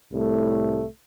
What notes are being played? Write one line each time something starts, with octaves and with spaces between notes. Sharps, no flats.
C2 A2 A3